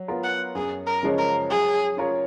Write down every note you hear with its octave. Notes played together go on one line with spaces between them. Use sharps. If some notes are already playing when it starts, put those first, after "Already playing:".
Already playing: F#3
B3 F4 A#4
F#5
F#2 G#4
A#4
C#3 F3 G#3 C#4
A#4
F#3 G#4
C#4 F4 A#4 C#5